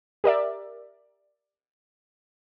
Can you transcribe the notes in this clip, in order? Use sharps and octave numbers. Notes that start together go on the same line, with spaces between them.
G4 A#4 D5 E5